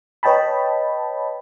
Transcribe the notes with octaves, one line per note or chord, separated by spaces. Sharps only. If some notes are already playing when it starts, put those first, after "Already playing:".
B4 C#5 D#5 G5 A5 B5